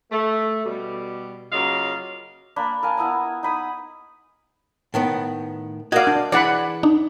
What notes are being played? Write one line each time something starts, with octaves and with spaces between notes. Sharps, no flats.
A3
B2 G3
C#3 F#3 A#3 F4 D#5 F5
A#3 D4 B5
A#4 F5 G#5 A5
B3 E4 D#5 A#5
D#4 B5 D#6
A2 D#3 B3
F#4 A#4 D5 D#5 F5 G#6
D4
E3 G#4 D5 E5 F#5 B5
D4 D#4